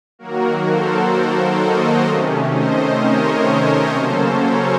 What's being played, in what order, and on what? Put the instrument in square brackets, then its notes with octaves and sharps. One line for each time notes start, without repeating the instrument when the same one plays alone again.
[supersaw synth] D#3 F#3 A#3 F#4 A#4
A4 C5
C5 D#5
C3 D#3 A3 C#4
C5 D#5
A#4 C#5
C#3 F#3 A#3 C#4 A4 C5
A#4 C#5